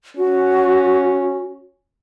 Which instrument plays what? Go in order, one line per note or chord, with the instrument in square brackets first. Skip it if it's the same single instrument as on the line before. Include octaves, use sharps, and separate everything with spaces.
[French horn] C#4 [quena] F#4